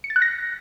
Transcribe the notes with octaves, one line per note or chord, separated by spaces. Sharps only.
C#7
A6
F#6
A#6